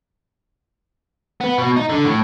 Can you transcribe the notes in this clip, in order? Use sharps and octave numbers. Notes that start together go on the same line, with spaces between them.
B3
B2
D#4
D3
A2